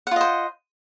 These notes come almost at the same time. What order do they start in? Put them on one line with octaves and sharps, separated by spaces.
F#5 F4 D#5 C5